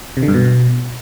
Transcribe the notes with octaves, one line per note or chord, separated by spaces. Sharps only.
C3
D3
G2
B2